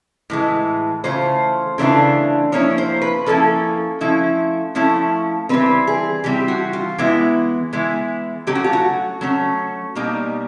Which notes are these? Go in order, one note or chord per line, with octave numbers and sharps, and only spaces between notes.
A2 E3 G#3
C#3 E3 A3 F4 C5
C#3 E3 A3 D4 F4
F3 A#3 C#4 E4 C#5
C5
B4
F3 A#3 C#4 E4 A4
F3 A3 C#4 E4
F3 A3 C#4 E4
E3 G3 C4 B4
G#4
E3 G3 C4 G4
F#4
F4
E3 G#3 B3 E4
E3 G#3 B3 E4
F#3 A3 C#4 G4
F#4
F4
F#4
F#3 A3 C#4
B2 G3 A#3 D#4